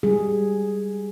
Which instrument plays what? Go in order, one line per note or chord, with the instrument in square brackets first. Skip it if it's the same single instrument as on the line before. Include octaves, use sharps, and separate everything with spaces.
[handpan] G3 G#4